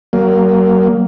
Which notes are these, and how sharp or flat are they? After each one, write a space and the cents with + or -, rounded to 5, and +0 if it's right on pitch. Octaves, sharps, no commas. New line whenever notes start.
F#3 +35 A#3 +0